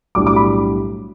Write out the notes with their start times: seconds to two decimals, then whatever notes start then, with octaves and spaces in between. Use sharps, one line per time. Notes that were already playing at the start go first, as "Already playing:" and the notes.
0.15 B1 A2 G3 D4 D6
0.27 D6
0.36 B5